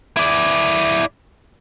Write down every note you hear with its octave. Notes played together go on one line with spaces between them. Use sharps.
E4 D5